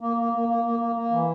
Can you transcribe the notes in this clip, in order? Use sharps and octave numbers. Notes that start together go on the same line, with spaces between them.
A#3
A#3
A#3
A#3
A#3
A#3
A#3
E3